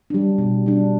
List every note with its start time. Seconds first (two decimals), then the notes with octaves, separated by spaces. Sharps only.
0.10 G3 D4
0.38 B2
0.66 G3 D4